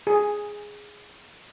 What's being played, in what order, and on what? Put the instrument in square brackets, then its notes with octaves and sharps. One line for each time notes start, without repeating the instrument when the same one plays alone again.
[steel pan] G#4